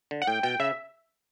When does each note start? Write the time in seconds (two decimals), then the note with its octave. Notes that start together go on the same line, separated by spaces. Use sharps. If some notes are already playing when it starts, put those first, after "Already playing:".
0.11 D3
0.22 F#5
0.27 A2 G5
0.43 B2 G5
0.60 C#3 E5